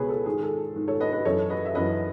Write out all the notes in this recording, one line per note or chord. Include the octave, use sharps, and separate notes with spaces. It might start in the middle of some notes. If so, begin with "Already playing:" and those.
Already playing: C#2 B2 G#4 B4 C#5
A4
G#2 D#3 G#4
A4
G#2 D#3
A4 C#5
B4 D#5
B4 D#5
F#2 E3 A4 C#5
B4 D#5
E5
F#2 E3 B4 D#5